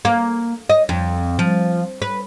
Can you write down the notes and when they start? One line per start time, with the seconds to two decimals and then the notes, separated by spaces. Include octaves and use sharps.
0.05 A#3
0.70 D#5
0.89 F2
1.39 F3
2.02 B4